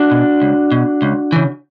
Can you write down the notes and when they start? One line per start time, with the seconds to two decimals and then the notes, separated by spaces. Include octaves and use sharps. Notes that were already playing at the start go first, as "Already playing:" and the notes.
Already playing: D4 F#4
0.11 B2
0.42 C#2
0.72 B2
1.02 C#2
1.32 C#3 E3